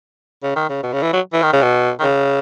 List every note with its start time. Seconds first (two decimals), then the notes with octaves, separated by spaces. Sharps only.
0.43 C#3
0.56 D#3
0.69 C#3
0.83 B2
0.93 C#3
1.03 E3
1.13 F#3
1.33 E3
1.43 D#3
1.53 C#3
1.62 B2
2.00 D#3
2.03 C#3